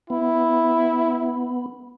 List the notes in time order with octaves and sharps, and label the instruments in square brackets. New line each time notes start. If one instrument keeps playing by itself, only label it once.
[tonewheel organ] B3 [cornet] E4